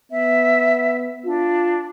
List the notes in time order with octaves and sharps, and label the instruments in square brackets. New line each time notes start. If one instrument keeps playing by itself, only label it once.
[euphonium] B3 [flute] E5
[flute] D4 [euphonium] F4